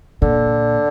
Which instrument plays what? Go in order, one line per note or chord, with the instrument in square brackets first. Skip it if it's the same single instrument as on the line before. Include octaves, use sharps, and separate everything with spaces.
[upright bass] A#2 [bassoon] D3